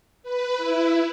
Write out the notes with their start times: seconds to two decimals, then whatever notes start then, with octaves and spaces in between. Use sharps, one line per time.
0.23 B4
0.57 E4